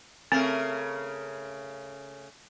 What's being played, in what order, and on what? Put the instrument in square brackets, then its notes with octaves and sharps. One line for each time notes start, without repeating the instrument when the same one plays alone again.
[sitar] C#3 A3 A#4 [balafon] C4